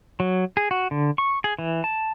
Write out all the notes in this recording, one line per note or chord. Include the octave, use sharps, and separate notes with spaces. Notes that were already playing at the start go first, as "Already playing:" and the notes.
F#3
G#4
F#4
D3
C#6
G#4
E3
A5